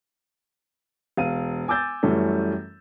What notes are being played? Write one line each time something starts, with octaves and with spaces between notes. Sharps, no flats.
E1 F5 D#7
G#5 D6 E6 G6 A6
F#2 E3 G3 A3 C#4